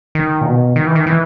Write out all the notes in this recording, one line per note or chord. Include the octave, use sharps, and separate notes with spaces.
D#3
A#2
B2
D#3
E3
D#3
E3